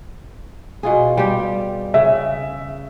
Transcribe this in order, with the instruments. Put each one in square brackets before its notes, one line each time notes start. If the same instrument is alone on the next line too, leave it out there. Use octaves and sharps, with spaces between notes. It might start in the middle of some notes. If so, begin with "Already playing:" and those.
[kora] B2 F4 G#4
G3 F4 G4
[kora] C#3 [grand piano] E5